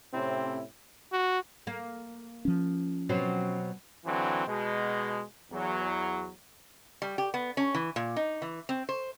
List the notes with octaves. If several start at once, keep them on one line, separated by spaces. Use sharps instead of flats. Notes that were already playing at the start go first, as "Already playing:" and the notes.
A2 C3 C4 C#4 E4
F#4
A#3
F3 C#4
B2 F#3 C4
D3 E3 F#3 C4
B2 G#3
E2 F#3
G3
G4
B3
C#4
E3
A#2
D#4
E3
C4
C5